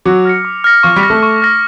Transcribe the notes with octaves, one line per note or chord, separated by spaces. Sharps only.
F#3 F#4 D6
F6 A#6 C#7
D6
F6 A#6 C#7
F3 F4 C#6
G3 G4
F6 A#6
A3 A4
C#6
F6 A#6